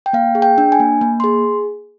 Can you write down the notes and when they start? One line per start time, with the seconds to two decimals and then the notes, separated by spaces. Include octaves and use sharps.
0.06 G5
0.13 A#3 F5
0.35 G#4
0.42 G5
0.58 D4
0.72 G#5
0.80 A#3
1.01 A#3
1.20 G#4 C6